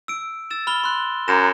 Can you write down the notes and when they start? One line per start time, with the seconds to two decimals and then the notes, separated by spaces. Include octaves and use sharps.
0.08 E6 D7
0.50 E6 A6 E7
0.67 B5 F6 G7
0.84 C6 F#6
1.28 F#2 A#5 A#6 E7